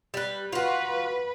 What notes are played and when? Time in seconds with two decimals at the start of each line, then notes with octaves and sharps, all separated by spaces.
0.14 G3 B4
0.52 F4 F#4 B4